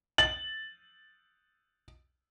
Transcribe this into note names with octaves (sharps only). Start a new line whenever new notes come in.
A6 F#7